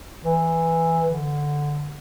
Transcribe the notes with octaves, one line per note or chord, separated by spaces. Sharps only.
E3
D3